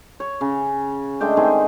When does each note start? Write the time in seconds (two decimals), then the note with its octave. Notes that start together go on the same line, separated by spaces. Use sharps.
0.20 C#5
0.41 C#3
1.21 G#3 A3 D4 G5
1.37 D#3 C4 D#4 G#4